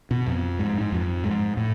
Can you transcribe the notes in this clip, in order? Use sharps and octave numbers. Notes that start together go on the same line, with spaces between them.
B2
F2
G#2
G#2
F2
G#2
A2